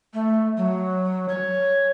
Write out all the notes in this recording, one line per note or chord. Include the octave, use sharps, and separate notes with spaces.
A3
F#3
C#5